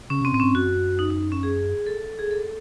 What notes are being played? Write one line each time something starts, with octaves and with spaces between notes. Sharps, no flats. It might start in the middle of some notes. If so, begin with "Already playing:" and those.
C#3 C#4
C3 C4
A2 C4
G#2 C#4
F#2 F#4
D#4
D#4
C#4
G#4
A4
G#4
A4